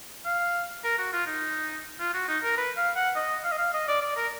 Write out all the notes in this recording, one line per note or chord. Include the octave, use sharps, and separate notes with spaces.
F5
A#4
F#4
F4
D#4
F4
F#4
D#4
A#4
B4
F5
F#5
D#5
F5
D#5
F5
D#5
D5
D5
A#4